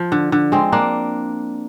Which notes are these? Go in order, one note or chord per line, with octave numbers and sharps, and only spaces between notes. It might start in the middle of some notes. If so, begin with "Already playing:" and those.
Already playing: F3
D3
D3
G#3 C4
A#3 D4